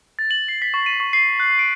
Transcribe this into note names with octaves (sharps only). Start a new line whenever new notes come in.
A6
F#7
C7
B6
C#6
D#7
C#6
C7
F#6
D7